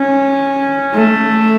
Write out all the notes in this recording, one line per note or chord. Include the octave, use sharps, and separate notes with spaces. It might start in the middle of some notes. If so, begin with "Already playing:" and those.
Already playing: C#4
A3